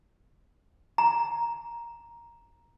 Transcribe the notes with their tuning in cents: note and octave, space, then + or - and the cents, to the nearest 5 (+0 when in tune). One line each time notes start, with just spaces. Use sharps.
A#5 +5